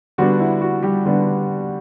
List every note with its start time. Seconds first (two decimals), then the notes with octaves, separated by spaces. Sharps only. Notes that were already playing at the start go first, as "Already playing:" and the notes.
0.18 D3 G3 B3 D4 F#4
0.40 E4
0.61 F#4
0.83 G3 G4
1.05 D3 G3 B3 D4